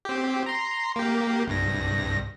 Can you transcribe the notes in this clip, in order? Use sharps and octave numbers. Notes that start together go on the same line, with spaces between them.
C4 G4
A#5 C6
A#3 G4
C2 G2 A#6